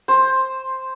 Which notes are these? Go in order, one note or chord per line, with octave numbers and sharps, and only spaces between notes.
C5